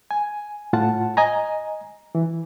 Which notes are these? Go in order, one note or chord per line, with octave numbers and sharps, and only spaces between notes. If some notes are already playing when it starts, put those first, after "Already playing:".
G#5
A2 F4 F#5 A5
D#5 G#5 A#5
E3